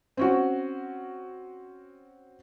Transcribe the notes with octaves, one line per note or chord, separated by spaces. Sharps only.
C4 C#4 F#4